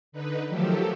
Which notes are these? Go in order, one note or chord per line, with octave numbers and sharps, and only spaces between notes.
D3 D#4 B4
D#3 F3 F#3 A3 G4 A4